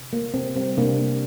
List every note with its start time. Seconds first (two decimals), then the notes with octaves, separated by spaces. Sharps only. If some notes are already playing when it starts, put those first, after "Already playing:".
Already playing: C3
0.13 A#3
0.34 C3 C4
0.55 G3 C4
0.77 C3 A#3 D4
0.99 A#3